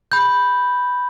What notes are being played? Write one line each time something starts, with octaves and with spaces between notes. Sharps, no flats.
B5 G6